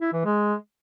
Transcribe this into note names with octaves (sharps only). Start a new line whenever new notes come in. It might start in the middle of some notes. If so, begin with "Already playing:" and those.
E4
E3
G#3